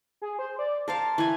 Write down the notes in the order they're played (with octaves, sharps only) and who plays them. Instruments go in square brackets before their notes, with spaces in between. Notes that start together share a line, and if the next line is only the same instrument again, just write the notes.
[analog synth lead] G#4
C5
D5
[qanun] A#4 C5 F5 [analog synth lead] A5
[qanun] E3 G#5